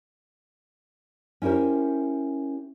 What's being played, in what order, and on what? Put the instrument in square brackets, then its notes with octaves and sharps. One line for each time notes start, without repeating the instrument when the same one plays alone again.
[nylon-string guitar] C#4 E4 G4 A#4 C5